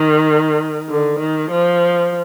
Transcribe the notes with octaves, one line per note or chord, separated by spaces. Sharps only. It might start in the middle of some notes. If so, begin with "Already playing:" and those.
Already playing: D#3
D3
D#3
F3